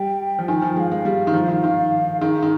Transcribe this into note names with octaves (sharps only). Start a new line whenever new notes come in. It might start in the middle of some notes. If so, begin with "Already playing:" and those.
Already playing: G3 G5
F3
D#3 G#5
F3 G#5
G5
G#3 F5
G#3 F5
G3
D#3
F3
D#3
D#3
D#3 G#4
D#3